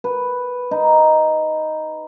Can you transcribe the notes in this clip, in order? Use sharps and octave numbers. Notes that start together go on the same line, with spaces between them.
B4
D#4